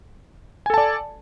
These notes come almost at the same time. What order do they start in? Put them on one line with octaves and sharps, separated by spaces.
G#5 A4 A5 D5